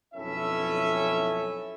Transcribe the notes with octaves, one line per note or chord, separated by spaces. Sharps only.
B1 F2 C#4 E4 A4 E5